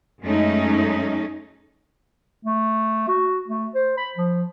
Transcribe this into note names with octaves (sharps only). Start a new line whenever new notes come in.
F#2 G#3 A3 C#4 D#4
A3
F#4
A3
C5
B5
F3